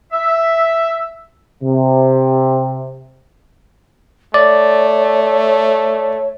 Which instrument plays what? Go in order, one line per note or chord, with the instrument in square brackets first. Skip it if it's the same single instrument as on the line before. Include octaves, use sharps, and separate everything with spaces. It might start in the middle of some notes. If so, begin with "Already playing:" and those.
[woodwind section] E5
[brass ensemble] C3
[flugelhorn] A3 [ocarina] C#5 [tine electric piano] D5